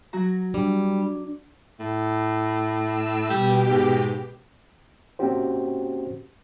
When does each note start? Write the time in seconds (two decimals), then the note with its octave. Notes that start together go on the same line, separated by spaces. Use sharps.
0.13 F#3 F#4 A#5
0.54 G3 D4
1.80 A2
2.82 E6
3.30 B2 G3 G4
3.70 G#2
5.19 A#3 C4 C#4 F#4 G4 C5